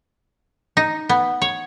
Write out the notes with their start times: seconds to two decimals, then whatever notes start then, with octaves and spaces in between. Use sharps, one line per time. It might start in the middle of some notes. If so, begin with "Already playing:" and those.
0.77 D#4
1.09 B3
1.42 C#5